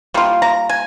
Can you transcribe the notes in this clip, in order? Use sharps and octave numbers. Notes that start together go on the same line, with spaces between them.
G3 A#3 F4
A#5
G#5